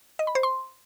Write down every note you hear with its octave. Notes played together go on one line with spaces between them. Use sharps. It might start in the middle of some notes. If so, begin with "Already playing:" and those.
D#5
B5
C5
C6